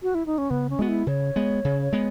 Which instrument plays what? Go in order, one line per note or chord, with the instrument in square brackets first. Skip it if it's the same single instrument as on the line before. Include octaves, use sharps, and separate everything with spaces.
[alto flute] F#4
E4
D#4
C#4
[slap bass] C#3 [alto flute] B3
[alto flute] C#4
[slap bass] G#3 B3 [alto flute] F#4
[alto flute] E4
[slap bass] C#3 [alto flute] C#5
[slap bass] G#3 B3
C#3
G#3 B3